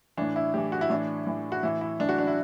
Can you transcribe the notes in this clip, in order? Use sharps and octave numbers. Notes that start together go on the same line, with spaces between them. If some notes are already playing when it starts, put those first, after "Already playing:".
A2 E3 D4
E4
A2 E3 G4
F#4
E4
A2 E3 D4
A2 E3
F#4
A2 E3 E4
E4
A2 E3 D4
F#4
D4
E4